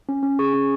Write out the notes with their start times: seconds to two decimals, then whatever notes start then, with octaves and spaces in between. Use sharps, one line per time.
0.09 C#4
0.23 C#4
0.39 G#4 C#6
0.54 C#4